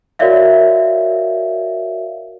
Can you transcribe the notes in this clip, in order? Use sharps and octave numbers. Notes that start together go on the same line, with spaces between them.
F#4 A#4 C#5 D5 E5 F5